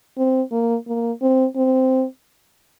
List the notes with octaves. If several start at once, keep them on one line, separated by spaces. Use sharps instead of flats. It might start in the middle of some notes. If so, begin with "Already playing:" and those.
C4
A#3
A#3
C4
C4